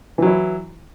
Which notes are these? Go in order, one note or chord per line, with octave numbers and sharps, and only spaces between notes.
E3 F#3 E4